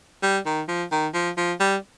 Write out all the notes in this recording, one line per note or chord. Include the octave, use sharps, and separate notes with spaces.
G3
D#3
F3
D#3
F3
F3
G3